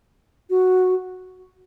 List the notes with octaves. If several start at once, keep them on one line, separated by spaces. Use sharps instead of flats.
F#4